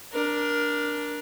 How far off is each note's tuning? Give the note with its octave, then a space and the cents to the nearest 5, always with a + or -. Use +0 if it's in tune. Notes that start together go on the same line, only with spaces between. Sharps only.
D4 +0 A#4 +20